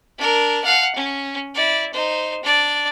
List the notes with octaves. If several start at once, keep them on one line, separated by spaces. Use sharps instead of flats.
D4 A#4
F5 F#5
C#4
E4 D5
D#4 C5
D4 D5